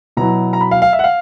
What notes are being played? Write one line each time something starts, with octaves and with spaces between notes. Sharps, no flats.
B2 F#3 B3 E4 A#5
A#5
B5
F5
F5
E5
F#5
F5